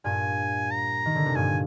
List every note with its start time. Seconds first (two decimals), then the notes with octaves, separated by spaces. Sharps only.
0.04 G2 A#2 G#5
0.71 A#5
1.06 D#3
1.16 D3
1.26 C3
1.35 G2 A#2 G#5